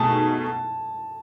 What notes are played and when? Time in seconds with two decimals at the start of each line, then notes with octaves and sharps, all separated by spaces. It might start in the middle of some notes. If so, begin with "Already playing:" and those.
Already playing: B2 A3 D#4 G#4 A5